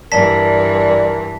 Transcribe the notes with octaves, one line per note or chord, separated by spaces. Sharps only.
G2 E3 A#4 D5 A5 B6